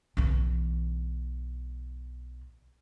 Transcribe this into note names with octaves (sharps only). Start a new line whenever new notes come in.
B1 E3